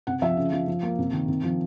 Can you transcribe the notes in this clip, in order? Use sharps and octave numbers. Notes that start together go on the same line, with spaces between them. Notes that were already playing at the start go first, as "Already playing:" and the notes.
C3 F#5
F3 E5
C#3
F3
F3
A#3
C3
D#3
C3
F3